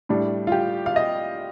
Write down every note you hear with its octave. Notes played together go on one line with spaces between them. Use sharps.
A2 G3 D4
F4
G4
F5
D#5